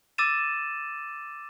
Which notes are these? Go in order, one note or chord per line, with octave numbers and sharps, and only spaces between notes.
D6 E6 A6 D#7 E7